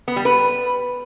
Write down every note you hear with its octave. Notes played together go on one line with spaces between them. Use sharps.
B3
G3
B4